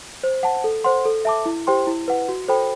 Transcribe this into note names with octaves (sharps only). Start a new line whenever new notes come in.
C5
F#5 A5
A4
C5 F#5 C6
A4
E5 A5 D6
E4
G4 C5 G5 C6
E4
B4 F#5
F#4
A4 C5 G5 B5